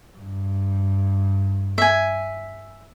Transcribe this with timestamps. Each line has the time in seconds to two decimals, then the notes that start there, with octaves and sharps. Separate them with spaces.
0.17 G2
1.78 E5 G#5